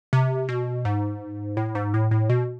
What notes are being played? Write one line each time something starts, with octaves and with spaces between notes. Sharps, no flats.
C3
B2
G#2
A2
G#2
A2
A2
B2